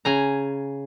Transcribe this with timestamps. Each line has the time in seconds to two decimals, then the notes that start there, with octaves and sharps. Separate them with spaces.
0.05 C#3 G#5 A#5